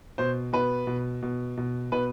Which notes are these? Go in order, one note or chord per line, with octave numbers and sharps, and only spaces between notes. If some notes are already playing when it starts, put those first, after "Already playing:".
B2 C5
B2 B4
B2
B2
B2
B2 B4